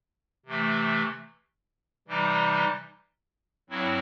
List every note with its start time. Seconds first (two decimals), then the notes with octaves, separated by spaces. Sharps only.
0.46 C3 E3 A3
2.08 C3 E3 G3 D#4
3.70 G2 F#3 C4 E4